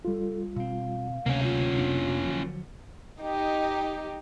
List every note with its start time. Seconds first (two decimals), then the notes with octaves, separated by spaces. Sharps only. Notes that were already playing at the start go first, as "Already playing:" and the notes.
0.05 G3 F4 A4
0.56 B2 C4 F5
1.26 D2 C3 A#3 C#4
1.43 F4
1.78 F2 B3 D4
2.25 D3 F3 F#3
3.20 D#4 G4